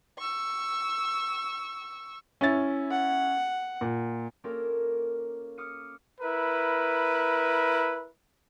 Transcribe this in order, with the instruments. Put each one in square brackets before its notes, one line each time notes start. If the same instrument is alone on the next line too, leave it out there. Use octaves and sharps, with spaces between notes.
[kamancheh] C#6 E6
[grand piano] C#4 E4 A6
[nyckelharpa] F#5
[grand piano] A#2
[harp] A#3 C#4 F4 G4 A4 A#4
D6 D#6 F6 C#7 D#7
[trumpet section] E4 A#4 B4